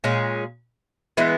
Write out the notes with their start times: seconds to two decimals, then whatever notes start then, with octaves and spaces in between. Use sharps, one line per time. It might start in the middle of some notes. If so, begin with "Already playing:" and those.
0.04 A#2 G#3 C#4 G#4
1.17 E3 G#3 B3 E4